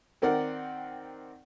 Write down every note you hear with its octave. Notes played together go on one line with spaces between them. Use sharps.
D#3 C4 A#4 D5 F#5